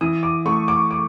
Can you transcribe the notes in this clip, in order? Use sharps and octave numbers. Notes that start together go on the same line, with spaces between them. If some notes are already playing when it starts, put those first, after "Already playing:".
E3 D#6
D6
A3 C#6
D6
D6